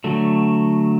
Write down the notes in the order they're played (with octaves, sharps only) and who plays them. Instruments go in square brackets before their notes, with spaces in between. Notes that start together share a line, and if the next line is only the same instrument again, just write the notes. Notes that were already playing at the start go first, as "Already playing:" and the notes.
[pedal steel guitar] D3 F#3 A3